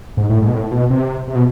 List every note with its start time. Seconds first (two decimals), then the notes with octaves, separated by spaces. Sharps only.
0.17 G#2
0.29 A2
0.42 G#2
0.48 B2
0.54 A2
0.71 B2
0.90 C3
1.28 C3
1.35 B2